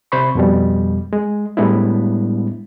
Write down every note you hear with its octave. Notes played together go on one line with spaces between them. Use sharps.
C3 C5 B5 C#6
F2 B2 G3
G#3
A2 G3 G#3 B3 D4 E4